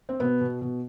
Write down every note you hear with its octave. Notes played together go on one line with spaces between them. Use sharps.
C4
B2 B3
B2
B2